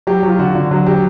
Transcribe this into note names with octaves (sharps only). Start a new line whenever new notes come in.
F#3 G4
F#3 F4
D3 F#4
D3
F#3 F#4
F#3 G4